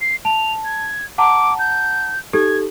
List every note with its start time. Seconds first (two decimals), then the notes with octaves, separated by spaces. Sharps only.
0.01 C7
0.25 A5 F7
0.65 G#6
1.18 F#5 A5 A#5 D6
1.59 G6
2.33 D#4 G4 A4 G#6